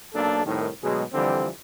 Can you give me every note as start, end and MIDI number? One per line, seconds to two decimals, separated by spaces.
0.14 0.42 35
0.14 0.42 58
0.14 0.42 62
0.14 0.42 69
0.45 0.68 36
0.45 0.68 45
0.45 0.68 51
0.83 1.03 38
0.83 1.03 47
0.83 1.03 54
0.83 1.03 56
1.14 1.49 41
1.14 1.49 50
1.14 1.49 52
1.14 1.49 55
1.14 1.49 60